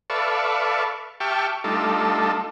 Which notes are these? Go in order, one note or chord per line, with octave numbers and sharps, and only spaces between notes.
A4 B4 D5 E5 F5 C#6
G4 E5 G5 A5 C#6 F6
G3 A3 D4 D#4 F4 A4